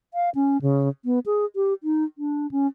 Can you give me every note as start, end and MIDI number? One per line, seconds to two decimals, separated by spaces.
0.14 0.30 77
0.35 0.61 61
0.62 0.89 49
1.05 1.19 59
1.26 1.45 68
1.56 1.73 67
1.83 2.04 63
2.18 2.50 62
2.51 2.67 61